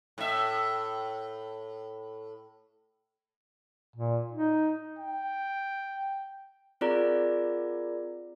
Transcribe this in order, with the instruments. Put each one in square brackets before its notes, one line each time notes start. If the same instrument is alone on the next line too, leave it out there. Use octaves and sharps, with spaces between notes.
[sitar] A2 E5
[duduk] A#2
D#4
[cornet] G5
[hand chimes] C4 F4 G#4 A#4 D5 A#5